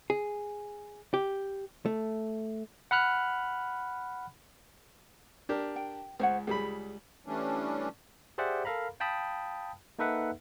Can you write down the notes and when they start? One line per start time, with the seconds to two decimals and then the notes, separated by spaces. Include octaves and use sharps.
0.10 G#4
1.14 G4
1.86 A3
2.91 F#5 B5 F6 F#6
5.49 D4 G4 A#4
5.76 G5
6.19 C#2 C5 C#5 F#5
6.47 C#2 G3 G#4 B5
7.27 E3 G3 A3 C#4 D4
8.38 G4 G#4 C5 D5 E5 F#5
8.65 A4 A#4 F5 A#5 B5
9.00 F5 G5 A5 B5 D#6
9.99 A#3 D#4 A4 B4 E5 F#5